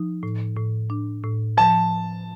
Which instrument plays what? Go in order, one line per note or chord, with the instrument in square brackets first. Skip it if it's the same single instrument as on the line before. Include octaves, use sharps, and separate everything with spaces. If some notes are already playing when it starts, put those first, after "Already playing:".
Already playing: [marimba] F3 D#4
A2
A2
D4
A2
[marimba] F3 [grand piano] A5